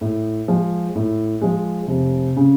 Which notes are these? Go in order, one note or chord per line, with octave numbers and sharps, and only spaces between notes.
A2
F3 G#3
A2
F3 G#3
F1
C#3